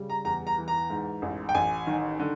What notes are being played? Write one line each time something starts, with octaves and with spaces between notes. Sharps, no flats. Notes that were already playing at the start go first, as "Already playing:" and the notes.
Already playing: C#3 G3
A#5
E2 A#5
A#5
E3
A#5
G#2
A1
G5
A1 G#5
D#3
D3